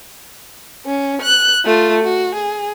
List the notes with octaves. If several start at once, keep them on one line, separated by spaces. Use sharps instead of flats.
C#4
F#6
A3 F4
F#4
G#4